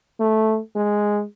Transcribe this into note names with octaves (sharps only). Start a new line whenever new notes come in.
A3
G#3